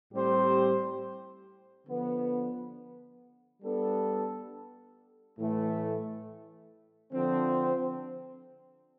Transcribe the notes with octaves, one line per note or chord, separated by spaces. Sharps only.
A2 G3 C4 G4 C5
D3 F3 B3
G3 B3 D4 A4
A2 E3 A3
D3 F3 C4